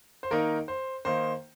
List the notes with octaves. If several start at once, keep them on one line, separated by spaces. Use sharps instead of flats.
C5
D#3 A#3 D#4 A#4
C5
D#3 A#3 D#4 C5